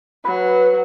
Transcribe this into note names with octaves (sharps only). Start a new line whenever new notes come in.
F#3 B4